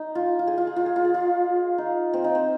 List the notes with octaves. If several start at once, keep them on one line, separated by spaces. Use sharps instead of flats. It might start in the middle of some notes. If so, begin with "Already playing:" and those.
Already playing: D#4
F4
F4
G#4
F4
G#4
F4
G#4
F4
G#4
F4
D#4
C4
D#4
C4